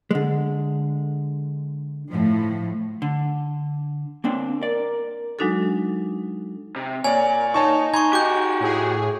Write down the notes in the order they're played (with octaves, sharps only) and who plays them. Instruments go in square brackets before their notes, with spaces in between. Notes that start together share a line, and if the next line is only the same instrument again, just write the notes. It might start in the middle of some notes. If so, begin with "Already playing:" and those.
[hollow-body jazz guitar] D3 G#3
[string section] A2 F3
[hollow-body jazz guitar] D3
A#3 C4 D4
[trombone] A#4 [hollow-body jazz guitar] D5
[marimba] F#3 G#3 D4 D#4 F#4 A4
[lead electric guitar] C3
[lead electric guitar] A#2 [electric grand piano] C#5 D5 [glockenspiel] G#5
[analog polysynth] D#4 [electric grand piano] C#5 A5 C#6
[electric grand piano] G#5 A#5 C6 [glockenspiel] C#6 G#6
[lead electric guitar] F#4 G4 [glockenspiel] D6 G6
[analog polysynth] A2 G#4